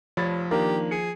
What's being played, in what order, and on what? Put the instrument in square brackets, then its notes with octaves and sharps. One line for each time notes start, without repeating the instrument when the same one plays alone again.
[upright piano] F1 [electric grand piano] F3 [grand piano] C#5 B5 A6
[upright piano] D#3 [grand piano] A#3 D4 A#4 [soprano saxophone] G4
[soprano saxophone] G#4 [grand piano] C#7